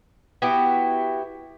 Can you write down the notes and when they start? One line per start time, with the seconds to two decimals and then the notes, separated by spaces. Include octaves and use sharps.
0.42 B3 E4 F#4 G4